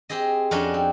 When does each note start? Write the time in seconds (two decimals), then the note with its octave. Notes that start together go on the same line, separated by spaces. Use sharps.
0.09 C4 G4 G#4 D#5
0.51 F2 C#4 D4 F#4 D#5
0.74 C4